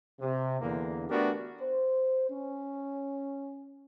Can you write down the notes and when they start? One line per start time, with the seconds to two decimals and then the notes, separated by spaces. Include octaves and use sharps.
0.20 C3
0.61 E2 D3 A#3
1.10 A3 B3 D4 F#4 G4 A#4
1.61 C5
2.30 C#4